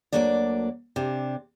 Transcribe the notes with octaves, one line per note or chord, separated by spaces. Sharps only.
D2 C3 F#3 A#3 D4 D5
C3 D4